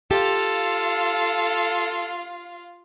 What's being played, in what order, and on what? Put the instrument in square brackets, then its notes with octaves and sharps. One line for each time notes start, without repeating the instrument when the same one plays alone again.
[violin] F4 F5 [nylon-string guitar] G4 [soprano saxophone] A4